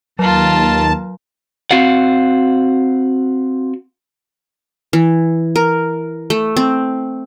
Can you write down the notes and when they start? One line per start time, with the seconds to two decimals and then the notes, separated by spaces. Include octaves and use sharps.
0.19 D#2 F#3 F4 A#4 A5
1.71 C4 F#4 F5 F#5
4.93 E3
5.56 A#4
6.30 A3
6.57 C4